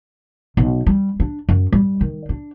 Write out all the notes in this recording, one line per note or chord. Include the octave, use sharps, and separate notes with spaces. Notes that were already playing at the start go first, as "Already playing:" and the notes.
B1
G3
D4
F#2
G3
D#3
D4